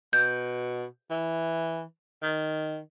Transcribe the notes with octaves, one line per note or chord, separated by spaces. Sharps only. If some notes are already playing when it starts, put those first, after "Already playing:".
B2 G6
E3
D#3